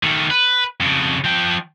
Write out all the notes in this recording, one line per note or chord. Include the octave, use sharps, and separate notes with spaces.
D#3 A3
B4
F2 C#3
F3 G5